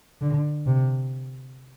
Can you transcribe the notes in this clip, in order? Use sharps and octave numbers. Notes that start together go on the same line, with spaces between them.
D3
C3